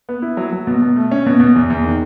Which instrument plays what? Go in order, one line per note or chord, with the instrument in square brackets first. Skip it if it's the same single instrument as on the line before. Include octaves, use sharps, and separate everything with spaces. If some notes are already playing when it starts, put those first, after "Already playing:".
[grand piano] B3
E4
F#3
F#3
B2
B2
A3
C#4
B2
B2
E2
E2
D#3